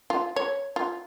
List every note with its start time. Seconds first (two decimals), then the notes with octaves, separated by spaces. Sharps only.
0.10 F4
0.36 C#5
0.76 F4